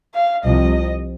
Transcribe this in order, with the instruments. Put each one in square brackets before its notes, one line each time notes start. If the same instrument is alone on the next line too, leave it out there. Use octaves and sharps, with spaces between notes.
[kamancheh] F5
[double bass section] C2 C3 F3 [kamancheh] D#5